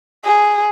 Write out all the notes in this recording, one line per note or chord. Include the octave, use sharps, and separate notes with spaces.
G#4